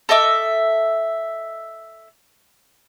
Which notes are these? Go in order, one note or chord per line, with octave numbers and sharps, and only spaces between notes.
A4 D#5 E5 D6